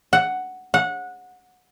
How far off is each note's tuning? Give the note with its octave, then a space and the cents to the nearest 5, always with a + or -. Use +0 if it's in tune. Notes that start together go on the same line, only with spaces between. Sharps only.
F#5 +5
F#5 -20